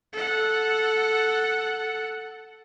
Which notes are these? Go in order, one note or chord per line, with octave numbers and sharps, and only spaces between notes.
A4 F#5